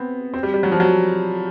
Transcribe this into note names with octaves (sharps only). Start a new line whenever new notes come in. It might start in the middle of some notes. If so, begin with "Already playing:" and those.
Already playing: B3 C4
C4
G3
G3
F#3
F3
F#3